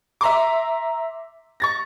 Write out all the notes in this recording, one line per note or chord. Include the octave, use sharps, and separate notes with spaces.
E5 A#5 C6 D6
C#6 A6 A#6